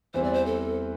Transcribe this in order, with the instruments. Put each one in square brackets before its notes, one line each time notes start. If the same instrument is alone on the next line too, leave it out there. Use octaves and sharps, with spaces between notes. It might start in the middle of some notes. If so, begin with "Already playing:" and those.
[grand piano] E2 E3 G3 C4 [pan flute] C5
[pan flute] D5
C5
A4